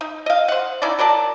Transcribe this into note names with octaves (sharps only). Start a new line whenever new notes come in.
D#4
D#5 F5
C5 F#5
C#4 D#4 E4 D5
F#3 A#4 D5 A5